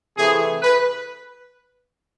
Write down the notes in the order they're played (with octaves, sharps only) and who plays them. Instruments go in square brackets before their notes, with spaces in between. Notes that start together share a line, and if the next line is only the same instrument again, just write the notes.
[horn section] C3 E3 A3 G#4
B4